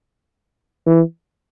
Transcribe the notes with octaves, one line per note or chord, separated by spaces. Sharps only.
E3